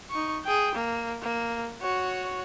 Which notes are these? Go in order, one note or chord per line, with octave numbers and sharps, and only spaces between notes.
D#4 C#6
G#4 G5
A#3
A#3
F#4 C#5